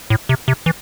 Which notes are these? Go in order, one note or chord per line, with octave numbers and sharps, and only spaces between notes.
A2
C3
C3
E3